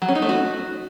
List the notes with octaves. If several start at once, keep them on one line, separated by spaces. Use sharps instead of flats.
F#3
C#4
D#4
A3
F#4